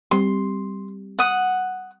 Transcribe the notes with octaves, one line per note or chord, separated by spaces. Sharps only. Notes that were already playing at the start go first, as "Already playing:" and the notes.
G3 C4 G4 C6
F#5 D#6